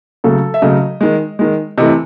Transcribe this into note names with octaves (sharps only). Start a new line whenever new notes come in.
C#3 F#3 A3 A4
E5
C#3 F#3 A3 D#5
D#3 G#3
D#3 G#3
C3 E3 A3 D#5